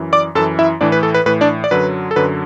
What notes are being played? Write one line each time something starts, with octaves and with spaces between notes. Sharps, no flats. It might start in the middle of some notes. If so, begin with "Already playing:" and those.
Already playing: F#2 E3
D5 D6
F#2 E3 A4 A5
E4 E5
A2 E3 D4 D5
B4
A4
B4
A2 E3 B4
D4 D5
D5
F#2 D3 F#3 B4
A4
F#2 D3 F#3 B4